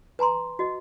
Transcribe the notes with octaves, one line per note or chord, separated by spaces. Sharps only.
B4 G#5 A#5 C6
F#4 D#5